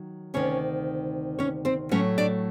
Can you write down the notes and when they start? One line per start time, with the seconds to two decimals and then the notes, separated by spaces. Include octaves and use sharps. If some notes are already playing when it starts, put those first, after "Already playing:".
Already playing: D#3 F#3
0.34 D2 C3 D#3 C#4 C#5
1.39 C#4 C#5
1.65 C4 C5
1.91 A2 F#3 A3 C#4 C#5
2.18 D4 D5